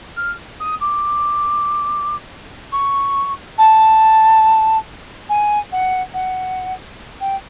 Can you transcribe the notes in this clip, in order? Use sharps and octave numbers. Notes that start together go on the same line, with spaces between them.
F6
D#6
D6
C#6
A5
G#5
F#5
F#5
G5